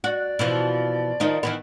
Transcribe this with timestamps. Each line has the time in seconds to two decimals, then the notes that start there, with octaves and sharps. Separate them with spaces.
0.04 F#4 D5
0.39 B2 E3 F3
1.20 D#3 F3 D#4
1.43 D#3 E3 B3